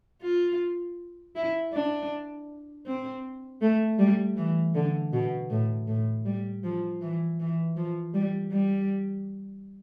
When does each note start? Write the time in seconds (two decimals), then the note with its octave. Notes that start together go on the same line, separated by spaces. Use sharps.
0.21 F4
1.35 E4
1.73 D4
2.86 C4
3.61 A3
3.99 G3
4.36 E3
4.74 D3
5.13 B2
5.50 A2
5.88 A2
6.25 G3
6.63 F3
7.01 E3
7.39 E3
7.76 F3
8.14 G3
8.51 G3